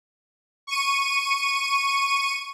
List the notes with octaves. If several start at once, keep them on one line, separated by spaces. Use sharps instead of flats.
C#6 D#7